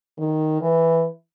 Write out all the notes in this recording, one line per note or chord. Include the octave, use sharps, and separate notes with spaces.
D#3
E3